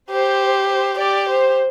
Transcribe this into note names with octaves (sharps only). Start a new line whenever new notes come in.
G4 C5
C5
G4 D5
C5